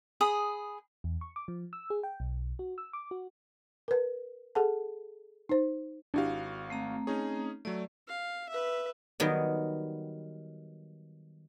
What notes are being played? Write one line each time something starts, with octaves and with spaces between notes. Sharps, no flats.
G#4 B5 D#6
E2
C#6
D6
F3
E6
G#4
G5
B1
F#4
E6
D6
F#4
A#4 B4
G#4 A4 F#5 A5
D#4 C5
G#1 D4 E4 F#4 G4 F5
A3 C4 A#5
C#4 D#4 G#4 C#5
F#3 A3 D5
F5
B4 E5
D#3 F#3 G3 B3